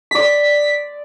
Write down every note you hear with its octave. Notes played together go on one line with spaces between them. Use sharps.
D5 D#6 B6